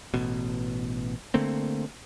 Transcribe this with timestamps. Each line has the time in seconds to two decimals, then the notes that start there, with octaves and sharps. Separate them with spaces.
0.14 A1 B2
1.34 D3 A3 A#3 C4